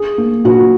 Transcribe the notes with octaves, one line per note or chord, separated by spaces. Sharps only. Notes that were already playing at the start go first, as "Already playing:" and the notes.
Already playing: G#4
A#3
A#2 F#4